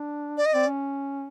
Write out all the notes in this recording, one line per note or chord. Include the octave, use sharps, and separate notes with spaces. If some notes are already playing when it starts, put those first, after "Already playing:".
Already playing: D4
D5
D#5
C4 D5
C#4